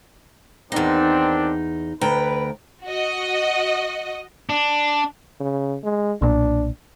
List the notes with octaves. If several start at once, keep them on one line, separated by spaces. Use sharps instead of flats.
E2 D#3 C4 D4 D#4
D2 B4 G5 A#5
F#4 D#5
D4
C#3
G#3
B1 A#2 D4